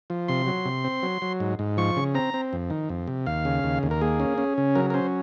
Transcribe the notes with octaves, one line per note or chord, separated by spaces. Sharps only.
F3
C3 C6
F#3
C3
C4
F#3
F#3
G#2
G#2
F3 C#6
C#3
C4 A#5
C4
F2
D#3
F2
C3
D#2 F5
C#3
D#2
D#2
A#4
A#3 G#4
C#4
C#4
C#3
F#3 A#4
A#4
C#4 C5